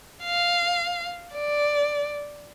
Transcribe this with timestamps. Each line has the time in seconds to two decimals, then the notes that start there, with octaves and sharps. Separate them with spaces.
0.24 F5
1.35 D5